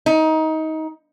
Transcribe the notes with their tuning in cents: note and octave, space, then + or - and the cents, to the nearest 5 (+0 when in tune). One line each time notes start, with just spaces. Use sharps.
D#4 +20